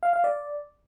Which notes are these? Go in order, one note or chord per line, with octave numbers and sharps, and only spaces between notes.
F5
F5
D5